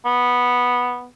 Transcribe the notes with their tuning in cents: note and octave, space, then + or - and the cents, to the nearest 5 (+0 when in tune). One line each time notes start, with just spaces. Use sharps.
B3 -5